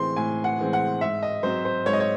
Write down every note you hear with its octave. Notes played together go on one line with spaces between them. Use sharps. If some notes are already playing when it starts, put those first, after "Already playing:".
Already playing: A2 E3 G#3 C4 C6
A2 G#5
F#5
E3 G#3 C4
F#5
G#2 E5
D#5
F#3 C4 C5
C5
G#2 C#5
D#5
C#5